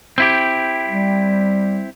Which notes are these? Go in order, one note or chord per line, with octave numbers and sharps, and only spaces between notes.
C4 E4 G4
G3